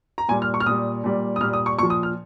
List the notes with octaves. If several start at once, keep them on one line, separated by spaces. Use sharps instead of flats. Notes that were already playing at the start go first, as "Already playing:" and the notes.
A#5
A#2 G3 G#5
F6
C#6
F6
A#2 G3 D#6
A#2 G3
D#6
A#2 G3 F6
D#6
C#6
A#2 F3 C#6
D#6
F6